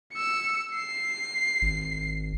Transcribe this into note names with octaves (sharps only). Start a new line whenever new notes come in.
E6 C#7
C7
G#1